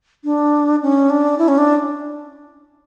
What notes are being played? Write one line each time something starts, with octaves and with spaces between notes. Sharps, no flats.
D4
C#4
D4
E4
C#4
D4